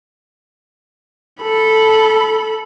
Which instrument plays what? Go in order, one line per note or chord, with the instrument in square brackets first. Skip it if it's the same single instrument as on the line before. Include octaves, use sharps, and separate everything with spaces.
[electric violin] A4 B5